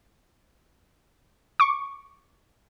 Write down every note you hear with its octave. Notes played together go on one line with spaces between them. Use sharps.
C#6 D6